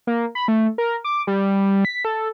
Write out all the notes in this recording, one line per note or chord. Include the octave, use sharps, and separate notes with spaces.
A#3
B5
A3
A#4
D6
G3
B6
A4